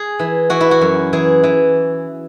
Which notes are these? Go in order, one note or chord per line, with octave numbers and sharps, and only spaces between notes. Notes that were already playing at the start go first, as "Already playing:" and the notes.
Already playing: G#4
E3
E3 F#4
E4
F#4
F#2
E3 G#4
E3